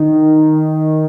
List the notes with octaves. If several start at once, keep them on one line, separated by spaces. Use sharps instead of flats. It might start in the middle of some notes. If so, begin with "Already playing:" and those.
Already playing: D#3